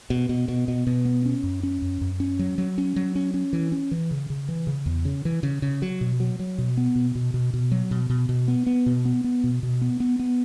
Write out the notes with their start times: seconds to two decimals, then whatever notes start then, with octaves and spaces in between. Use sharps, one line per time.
0.10 B2
0.29 B2
0.48 B2
0.68 B2
0.87 B2
1.05 B3
1.26 C#4
1.43 F#2
1.63 C#4
1.82 F#2
2.01 F#2
2.20 C#4
2.39 F#3
2.58 F#3
2.78 C#4
2.96 F#3
3.15 C#4
3.34 C#4
3.53 E3
3.72 C#4
3.91 E3
4.11 C#3
4.30 C#3
4.49 E3
4.67 C#3
4.86 E2
5.05 C#3
5.25 E3
5.43 C#3
5.62 C#3
5.82 F#3
6.01 B2
6.20 F#3
6.39 F#3
6.58 B2
6.77 B3
6.96 B2
7.15 B2
7.34 B2
7.54 B2
7.72 F#3
7.91 B2
8.10 B2
8.29 B2
8.48 B3
8.67 B3
8.86 B2
9.05 B3
9.24 B3
9.44 B2
9.63 B2
9.82 B3
10.00 B3
10.19 B3